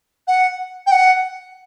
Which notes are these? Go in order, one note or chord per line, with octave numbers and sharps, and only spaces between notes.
F#5
G5
F#5